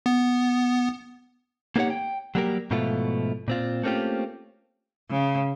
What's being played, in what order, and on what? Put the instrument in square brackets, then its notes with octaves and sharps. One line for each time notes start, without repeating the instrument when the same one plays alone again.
[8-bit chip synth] B3
[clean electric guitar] A#3 B3 D#4 G4 C#5 F#5
G5
F#3 G3 A#3 G4 A#4
G#2 B2 F3 A3 E4 F4
A#2 C4 F4
A3 A#3 C4 C#4 F4 G4
[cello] C#3